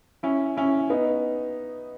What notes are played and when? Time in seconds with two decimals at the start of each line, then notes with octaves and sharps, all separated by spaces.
0.23 C#4 E4
0.57 C#4 E4
0.90 B3 D#4